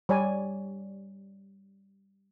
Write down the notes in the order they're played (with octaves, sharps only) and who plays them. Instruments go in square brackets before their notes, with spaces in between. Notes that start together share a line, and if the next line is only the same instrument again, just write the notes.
[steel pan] G3 C#5 D5 G#5